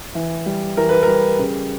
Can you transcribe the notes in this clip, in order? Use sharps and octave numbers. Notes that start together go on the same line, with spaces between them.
E3
G3
E3 A#4
B4
G3 A#4
C#3